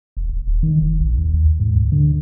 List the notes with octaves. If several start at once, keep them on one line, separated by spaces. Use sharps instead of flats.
F1
D1
D#1
D#3
F1
A#1
D#2
G#2
D2
D3